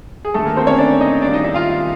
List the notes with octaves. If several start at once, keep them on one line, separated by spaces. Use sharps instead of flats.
G#4
D#2 D3 A3 A4
A#3 A#4
C4 C5
C#4 C#5
D4 D5
D#4 D#5
G#1 G2 D#3 D4 D5
D#4 D#5
E4 E5
F4 F5